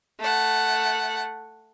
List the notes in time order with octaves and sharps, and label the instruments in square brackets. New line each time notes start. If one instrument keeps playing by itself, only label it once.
[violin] A3 F#5